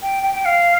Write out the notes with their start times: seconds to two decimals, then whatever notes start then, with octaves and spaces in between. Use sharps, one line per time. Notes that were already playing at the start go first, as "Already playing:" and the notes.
0.02 G5
0.23 G5
0.35 G5
0.45 F5